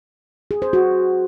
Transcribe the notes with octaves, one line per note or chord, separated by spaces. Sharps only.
G#4
C5
F#4